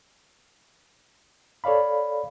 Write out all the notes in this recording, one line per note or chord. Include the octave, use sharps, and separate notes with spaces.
A4 C#5 D5 F5 B5